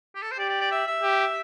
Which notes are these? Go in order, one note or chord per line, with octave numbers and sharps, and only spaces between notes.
G4
A4
C5
G4 D5
D5
D5
E5
E5
G4